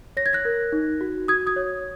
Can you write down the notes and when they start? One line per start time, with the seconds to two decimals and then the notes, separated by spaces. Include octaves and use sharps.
0.17 C#5 A#6
0.26 G#6
0.33 F#6 A#6
0.45 A#4
0.72 D#4
1.01 F#4
1.28 F#4 D#6 G#6
1.47 D#6 G#6
1.56 C#5